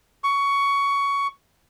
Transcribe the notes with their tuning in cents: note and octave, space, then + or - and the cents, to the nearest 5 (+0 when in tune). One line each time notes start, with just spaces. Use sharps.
C#6 +15